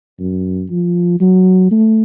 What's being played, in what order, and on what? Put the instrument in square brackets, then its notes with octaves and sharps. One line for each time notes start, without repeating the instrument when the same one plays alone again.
[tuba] F#2
F3
F#3
A3